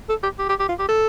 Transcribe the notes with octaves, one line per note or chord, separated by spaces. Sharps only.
A4
G4
G4
G4
G4
F4
G4
A4